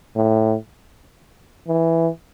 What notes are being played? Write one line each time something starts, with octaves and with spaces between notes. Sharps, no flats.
A2
E3